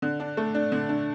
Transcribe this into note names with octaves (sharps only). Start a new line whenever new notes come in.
D3
D4
A3
D4
D3
D4